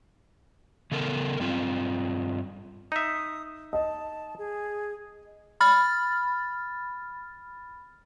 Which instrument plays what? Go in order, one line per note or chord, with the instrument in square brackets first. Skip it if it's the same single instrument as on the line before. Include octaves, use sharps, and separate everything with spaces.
[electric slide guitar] C#3 B3 A4 A#4
G2 C4 F4
[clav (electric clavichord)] D#4 E5 [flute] D#6
[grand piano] D#5 [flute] A5
[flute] G#4
[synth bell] B5 F6 A6